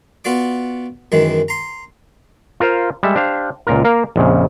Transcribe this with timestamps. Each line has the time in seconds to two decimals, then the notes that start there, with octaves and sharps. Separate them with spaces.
0.24 B3 F4 F#4 D5 D6
1.12 F#2 D#3 E3 G#3
1.48 A#5 C6
2.60 F4 A#4 C5 F5
3.03 G3 G#3 A4 E5
3.16 D4 G4 C5 F5
3.67 C#2 A#2 F4 A#4
3.84 A#3 A#4 F5
4.16 A#1 F2 A#2 C#3